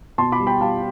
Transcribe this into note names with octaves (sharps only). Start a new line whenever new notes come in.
B2 A5 C6
B5 D6
G3
G5 B5
G3 F5 A5